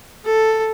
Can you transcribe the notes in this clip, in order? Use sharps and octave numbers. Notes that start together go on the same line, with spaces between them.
A4